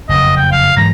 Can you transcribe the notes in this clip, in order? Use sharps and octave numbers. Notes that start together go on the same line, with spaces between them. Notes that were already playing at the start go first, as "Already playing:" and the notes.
F#1 F2 D#5
G5
F5
G#2 E3 F#3 A#5